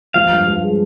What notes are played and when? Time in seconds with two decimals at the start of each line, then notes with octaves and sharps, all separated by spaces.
0.14 F3 F5
0.31 G2
0.46 G2
0.63 G#3